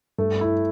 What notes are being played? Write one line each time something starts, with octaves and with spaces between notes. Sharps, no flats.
G2 A3
E4